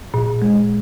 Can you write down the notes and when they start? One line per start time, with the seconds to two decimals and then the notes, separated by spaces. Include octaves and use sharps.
0.14 A#2
0.42 G#3